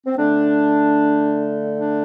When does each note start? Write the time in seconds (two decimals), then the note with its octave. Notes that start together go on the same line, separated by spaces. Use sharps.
0.06 C4
0.17 D3 A3 D4
1.77 D4